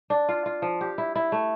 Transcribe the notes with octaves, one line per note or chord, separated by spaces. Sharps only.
D4
F4
F4
F3
G4
E4
E4
A3